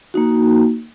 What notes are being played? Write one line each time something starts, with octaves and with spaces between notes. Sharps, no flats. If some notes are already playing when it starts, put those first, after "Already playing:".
A#3 D#4 F#4